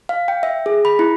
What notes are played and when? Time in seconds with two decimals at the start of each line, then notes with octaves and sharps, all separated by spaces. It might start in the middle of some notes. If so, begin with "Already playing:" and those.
0.09 F5
0.28 G5
0.43 E5
0.66 G#4
0.85 B5
0.99 E4